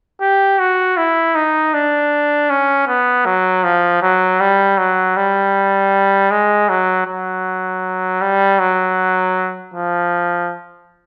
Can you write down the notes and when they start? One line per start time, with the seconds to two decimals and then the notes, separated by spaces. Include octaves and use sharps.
0.21 G4
0.59 F#4
0.97 E4
1.35 D#4
1.74 D4
2.50 C#4
2.87 B3
3.25 F#3
3.64 F3
4.02 F#3
4.40 G3
4.78 F#3
5.17 G3
6.31 G#3
6.69 F#3
7.06 F#3
8.21 G3
8.59 F#3
9.74 F3